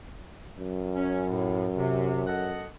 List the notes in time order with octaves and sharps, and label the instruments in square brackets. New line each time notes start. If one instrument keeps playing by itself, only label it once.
[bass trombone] F#2
[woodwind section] C#4
A2
C3
A4 D#5 F#5